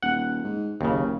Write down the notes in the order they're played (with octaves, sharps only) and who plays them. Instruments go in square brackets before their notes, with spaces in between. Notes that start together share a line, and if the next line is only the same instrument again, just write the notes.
[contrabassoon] D#1 [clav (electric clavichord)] F#5
[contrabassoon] G#2
[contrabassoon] F#1 [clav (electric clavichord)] D#2 C#3